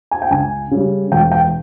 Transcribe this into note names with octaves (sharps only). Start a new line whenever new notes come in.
G#5
G5
C#2 G#5
C#3 G3
E1 G5
G5